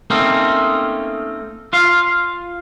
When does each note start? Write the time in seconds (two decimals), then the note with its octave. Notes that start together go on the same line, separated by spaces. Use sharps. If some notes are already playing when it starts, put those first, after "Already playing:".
0.10 A3 A#3 C4 C#4 D#4
1.73 F4 F5